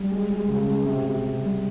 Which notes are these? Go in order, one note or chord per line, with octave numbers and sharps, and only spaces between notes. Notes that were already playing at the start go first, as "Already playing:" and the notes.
Already playing: G3
G#3
G#3
C#3
G#3
C3
C3
C3
G3